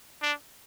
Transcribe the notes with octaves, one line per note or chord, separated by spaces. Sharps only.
D4